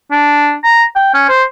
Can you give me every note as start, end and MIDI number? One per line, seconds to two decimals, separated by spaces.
0.11 0.54 62
0.63 0.83 82
0.96 1.12 79
1.14 1.28 61
1.29 1.43 72